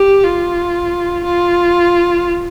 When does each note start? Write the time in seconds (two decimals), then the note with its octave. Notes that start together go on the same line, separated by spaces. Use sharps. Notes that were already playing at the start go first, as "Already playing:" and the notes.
Already playing: G4
0.24 F4
1.24 F4